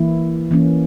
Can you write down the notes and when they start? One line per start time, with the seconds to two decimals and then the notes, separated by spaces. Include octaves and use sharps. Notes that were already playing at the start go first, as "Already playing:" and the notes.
Already playing: E3 A#3 E4
0.51 E3 A#3 C#4